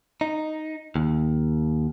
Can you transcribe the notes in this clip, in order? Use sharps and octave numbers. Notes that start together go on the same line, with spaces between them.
D#4
D#2